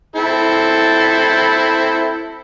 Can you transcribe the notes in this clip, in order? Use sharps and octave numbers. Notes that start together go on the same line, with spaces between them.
C4 E4 A4